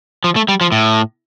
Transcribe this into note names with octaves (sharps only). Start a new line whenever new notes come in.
F3
A3
G3
F3
A2